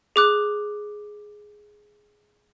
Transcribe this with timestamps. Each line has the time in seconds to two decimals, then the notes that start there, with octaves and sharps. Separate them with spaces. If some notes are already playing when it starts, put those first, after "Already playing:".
0.16 G#4 D6 F#6